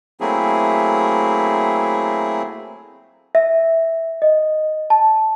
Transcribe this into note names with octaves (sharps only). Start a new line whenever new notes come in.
F#3 A3 A#3 C4 E4 G#4
E5
D#5
A5